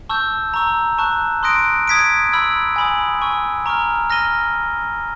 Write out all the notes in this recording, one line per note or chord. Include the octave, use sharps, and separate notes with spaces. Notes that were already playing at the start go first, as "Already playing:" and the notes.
A5 C#6 E6 G6
A#5 C#6 E6
A5 C#6 F#6
C6 D#6 F#6 A#6 D7
D#6 G#6 B6 D7
B5 E6 G#6
G#5 B5 D#6
G#5 C#6 E6
A#5 C#6 F6
F6 A#6 D#7 G7